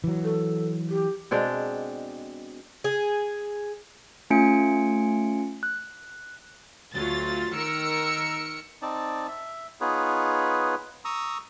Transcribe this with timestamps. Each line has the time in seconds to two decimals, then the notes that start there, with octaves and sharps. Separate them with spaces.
0.04 E3 F#3
0.24 A4
0.90 G4
1.31 B2 G#3 C4 D4
2.84 G#4
4.30 A3 C#4 F4 G#5 C#7 D7
5.63 F#6
6.94 D2 F#3 F4 A6
7.53 D#3 A#4 E6 C#7
8.82 C4 D#4 D5 A5
9.28 E5
9.81 B3 D#4 F4 G#4 B4 C#5
11.05 A#5 C#6 D#6 E6